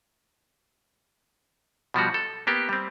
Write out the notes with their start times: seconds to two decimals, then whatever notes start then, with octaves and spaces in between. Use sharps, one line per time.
1.94 B2 F3 G3 F#4
2.14 A4
2.47 A#3 B3 G4
2.69 G3 C4